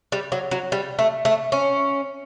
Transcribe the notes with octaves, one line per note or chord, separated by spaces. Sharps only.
G3
F#3
F#3
G3
A3
A3
C#4